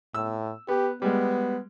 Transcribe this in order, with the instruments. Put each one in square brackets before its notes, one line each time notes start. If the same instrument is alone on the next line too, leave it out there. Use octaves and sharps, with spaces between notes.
[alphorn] A2 [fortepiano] E6
[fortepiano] B3 [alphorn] G4
[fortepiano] G3 G#3 [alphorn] B3